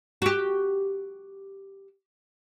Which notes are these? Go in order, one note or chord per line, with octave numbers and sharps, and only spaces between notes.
F#4 G4